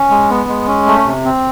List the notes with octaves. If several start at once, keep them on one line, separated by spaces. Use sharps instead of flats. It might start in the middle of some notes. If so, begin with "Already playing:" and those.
Already playing: C#4
G#3
B3
G#3
C#4
A3
C3
C4